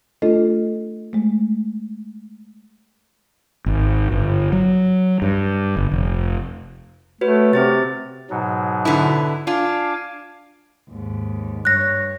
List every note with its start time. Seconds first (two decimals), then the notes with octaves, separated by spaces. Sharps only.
0.22 A3 D4 F4 A4 D#5
1.13 G#3 A3
3.66 G#1
4.12 G1
4.52 F#3
5.22 G2
5.77 G1
5.92 F1
7.21 A3 F#4 B4 C#5
7.53 C3 C4 C5 A6
8.30 G#2 B2 F#3
8.85 D3 B3 E4
9.47 D4 F4 F5 G#5 D6
10.89 D#2 G#2
11.65 G2 C#5 F#6 A#6